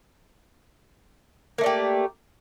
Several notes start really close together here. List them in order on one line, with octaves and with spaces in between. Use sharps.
A#3 A3 D5 G4